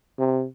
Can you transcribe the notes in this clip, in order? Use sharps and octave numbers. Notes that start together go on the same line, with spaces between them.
C3